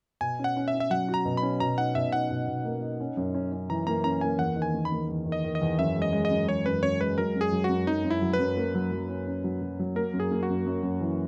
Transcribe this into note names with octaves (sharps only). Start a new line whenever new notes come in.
B2 G#5
C#4
F#5
C#4
E5
C#4
E5
F#3 F#5
F#4
A#5
B2
B5
C#4
B2 A#5
D#4 F#5
B2 E5
D#4 F#5
B2
B2
A#3
D#4
C#4
F#2
C#4
C#4
E3 A#5
A#3 A#5
C#4 A#5
A#3 G#5
E2 F#5
D#3
G#5
A#3
B5
A#3
E2
D#3
D#5
D#3
D#5
E2
F#2 E5
G#3
D#5
G#3
D#5
F#2
G#3 C#5
F#2 B4
F#2 C#5
G#3 B4
F#3 A#4
F#2
G#4
F#3
F#4
F#2
F#2 D#4
F#2
E4
F#3
B4
F#2
A#3
F#3
F#3
C#4
C#4
F#3
F#3
F#3
A#3 A#4
F#2
G#4
A#3
F#4
F#2
F#2
F#2
E3